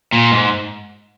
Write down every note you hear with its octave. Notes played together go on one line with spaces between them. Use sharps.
A#2
G#2